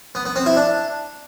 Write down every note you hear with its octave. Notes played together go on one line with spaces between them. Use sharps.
B3
B3
C4
E4
D4